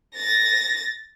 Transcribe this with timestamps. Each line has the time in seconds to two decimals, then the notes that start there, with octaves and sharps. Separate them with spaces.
0.16 A6 A#6